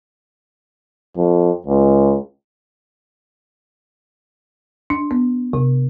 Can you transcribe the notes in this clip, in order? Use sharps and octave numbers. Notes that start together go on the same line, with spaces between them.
F2
C#2
D4
B3
C3